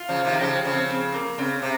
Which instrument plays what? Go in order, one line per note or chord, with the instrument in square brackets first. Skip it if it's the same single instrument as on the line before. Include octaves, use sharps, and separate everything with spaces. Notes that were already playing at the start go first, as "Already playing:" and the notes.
Already playing: [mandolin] F4
[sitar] C#3 F3
C3 D#3
[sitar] C#3 F3 [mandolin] G4
[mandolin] G#4
[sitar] C#3 F3
[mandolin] C4
C4
A#3
[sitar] C#3 [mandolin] C4
[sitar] C3